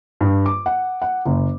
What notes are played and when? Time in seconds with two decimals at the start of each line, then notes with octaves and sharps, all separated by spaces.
0.21 G2
0.46 D6
0.66 F#5
1.02 F#5
1.26 F#1